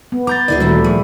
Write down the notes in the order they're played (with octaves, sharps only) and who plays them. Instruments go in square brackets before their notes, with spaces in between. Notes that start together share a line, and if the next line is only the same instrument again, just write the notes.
[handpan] B3
[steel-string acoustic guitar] A#5 [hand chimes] D6 G6 A6
[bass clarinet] D2 [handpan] D3 E4 [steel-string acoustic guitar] G#4 B4 D5
[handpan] A#2 G3 A3 [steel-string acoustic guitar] D#3 F#4
[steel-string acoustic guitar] F3 [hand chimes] G#4 A#4